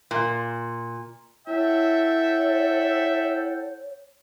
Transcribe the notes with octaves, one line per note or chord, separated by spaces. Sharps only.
A#2
E4 A4 C#5 E5 F#5 G5